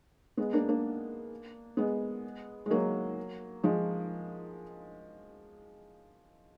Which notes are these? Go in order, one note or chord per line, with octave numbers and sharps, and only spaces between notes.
G#3 B3
A#3 D4
A#3 D4
G#3 B3
G#3
F#3 A#3
F3 G#3